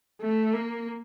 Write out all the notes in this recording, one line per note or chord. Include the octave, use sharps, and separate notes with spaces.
A3
A#3